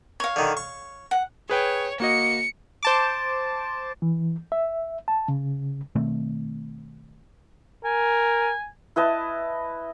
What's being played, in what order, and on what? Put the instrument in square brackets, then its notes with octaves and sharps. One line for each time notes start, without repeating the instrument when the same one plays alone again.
[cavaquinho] C#5 F5
[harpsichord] D3 D#3
C#6
[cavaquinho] F#5
[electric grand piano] G#4 B4 G5 [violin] C#5
[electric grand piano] A#3 F#4 D#5 [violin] C#7
[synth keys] C5 A5 D6
[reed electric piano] E3
E5
A5
C#3
[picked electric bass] B2 D#3 A3 C4
[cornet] A#4 [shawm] G#5
[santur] E4 B4 D#5 A5